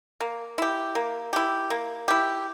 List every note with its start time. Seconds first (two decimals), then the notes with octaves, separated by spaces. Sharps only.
0.20 A#3
0.58 E4 G4
0.95 A#3
1.33 E4 G4
1.70 A#3
2.08 E4 G4